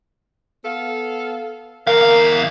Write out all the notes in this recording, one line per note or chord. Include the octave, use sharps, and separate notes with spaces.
B3 A4 F5
E2 A#4 F5